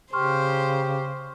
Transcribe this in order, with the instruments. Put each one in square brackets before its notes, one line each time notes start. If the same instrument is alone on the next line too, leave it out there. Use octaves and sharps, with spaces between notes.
[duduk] C#3 [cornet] G4 [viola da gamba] C5 [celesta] C6 C#6 F6